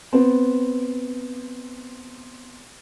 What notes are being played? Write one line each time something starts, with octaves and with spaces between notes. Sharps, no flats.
B3 C4